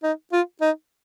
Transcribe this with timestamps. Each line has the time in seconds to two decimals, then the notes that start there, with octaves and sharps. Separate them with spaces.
0.03 D#4
0.32 F4
0.61 D#4